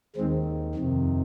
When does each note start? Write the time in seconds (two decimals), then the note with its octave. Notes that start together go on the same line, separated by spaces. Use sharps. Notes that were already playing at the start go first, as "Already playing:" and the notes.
0.16 D#2 D#3 G#3 C4
0.75 F2 C3 D#3